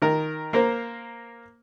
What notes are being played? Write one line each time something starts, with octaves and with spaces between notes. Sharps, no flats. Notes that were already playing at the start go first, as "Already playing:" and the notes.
D#3 A#4
A#3 A#4 C5